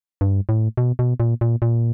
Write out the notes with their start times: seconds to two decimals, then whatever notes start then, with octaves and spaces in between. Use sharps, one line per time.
0.21 G2
0.49 A2
0.77 B2
0.99 B2
1.20 A#2
1.41 A#2
1.62 A#2